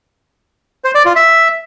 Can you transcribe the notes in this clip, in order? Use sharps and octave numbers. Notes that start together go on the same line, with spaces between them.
C5
D5
F4
E5